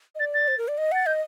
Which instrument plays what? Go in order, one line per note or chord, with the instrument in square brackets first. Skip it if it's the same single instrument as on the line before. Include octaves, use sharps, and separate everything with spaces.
[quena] D#5
[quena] D5 [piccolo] A6
[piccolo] A6
[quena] C5
A#4
D5
D#5
[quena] F#5 [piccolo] A6
[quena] D#5 [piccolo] G6